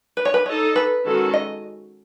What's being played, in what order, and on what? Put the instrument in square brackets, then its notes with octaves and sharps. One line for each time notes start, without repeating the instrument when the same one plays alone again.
[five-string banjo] B4
C#5
B4
[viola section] D#4 A4 D#5 [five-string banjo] C#5
[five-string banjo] B4
[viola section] D#3 G#3 C#4 F#4 A4
[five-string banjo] D#5